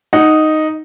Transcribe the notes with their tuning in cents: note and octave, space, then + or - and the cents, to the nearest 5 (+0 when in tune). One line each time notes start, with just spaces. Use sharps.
D#4 +0 F#5 +0